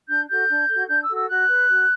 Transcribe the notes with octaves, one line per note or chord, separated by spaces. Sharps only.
D4 G6
F#4 A4 G6
D4
F#4 A4
D4 G6
E6
F#4 A4
E6
F#4 F#6
B4
F#4